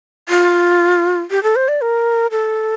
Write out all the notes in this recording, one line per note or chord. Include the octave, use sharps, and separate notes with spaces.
F4
G4
A4
C5
D5
A#4
A4